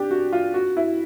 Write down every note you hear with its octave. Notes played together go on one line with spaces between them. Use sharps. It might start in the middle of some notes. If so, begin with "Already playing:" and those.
Already playing: D4 G4
F#4
F4
F#4
E4